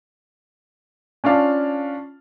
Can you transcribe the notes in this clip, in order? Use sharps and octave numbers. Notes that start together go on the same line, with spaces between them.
C#4 D4 F4 F5 A5